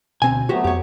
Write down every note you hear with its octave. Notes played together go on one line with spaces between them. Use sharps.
D2 B2 C4 G#5
F#3 A3 B3 F#4 G4 C5
F2 G4 C#5